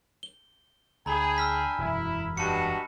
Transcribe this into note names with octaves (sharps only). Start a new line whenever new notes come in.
G7
D2 D4 G#4 G5 G#5 A#5 B5
E6 F6 B6
E1 F#2 E4
G2 G#3 F#4 G4 A5 C#7